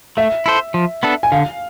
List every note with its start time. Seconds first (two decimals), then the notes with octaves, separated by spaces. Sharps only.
0.17 A3 E5
0.46 E4 A4 C5
0.74 F3
1.03 B3 D4 A4
1.23 G#5
1.32 D3 F5